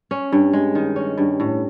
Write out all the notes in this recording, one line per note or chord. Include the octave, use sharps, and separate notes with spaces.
C#4
G2
G#3
D#3
C#4
G2
A2